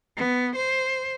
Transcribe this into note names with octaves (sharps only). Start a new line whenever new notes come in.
B3
C5